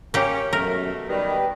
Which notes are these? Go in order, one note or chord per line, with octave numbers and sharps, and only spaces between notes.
A#3 C#4 G4
F#2 B2 A3 A#4
B2 D#3 G3 G4 B4